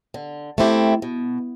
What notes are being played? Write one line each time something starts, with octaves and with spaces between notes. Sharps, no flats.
D3
A3 C4 E4 G4
B2